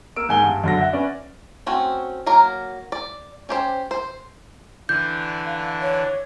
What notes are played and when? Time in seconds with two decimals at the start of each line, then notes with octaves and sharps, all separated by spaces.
0.16 A#3 E6 D7
0.29 G#2 G#5 G7
0.43 G2
0.64 F#2 D3 A#6
0.78 E5 F#5
0.93 C#4 B4 D5
1.66 A3 C4 C#4 F#4
2.26 F#3 A#3 A#4
2.92 D5
3.49 C#4 G4 C5
3.91 C5
4.89 D3 E3 D4 G6
5.46 F5
5.82 C#5